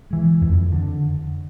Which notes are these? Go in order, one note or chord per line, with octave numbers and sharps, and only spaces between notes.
E3 G#3
F2
D3